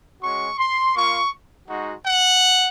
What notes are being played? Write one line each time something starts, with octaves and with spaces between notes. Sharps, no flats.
G#3 C#4 F#4 C#6
C6
A#3 F4 C#6
G#3 D#4 F#4
F#5